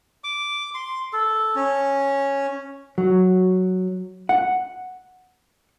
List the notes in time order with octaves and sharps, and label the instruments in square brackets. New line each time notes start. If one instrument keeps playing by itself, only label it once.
[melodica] D6
C6
A4
C#4
[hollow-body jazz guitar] F#3
F#5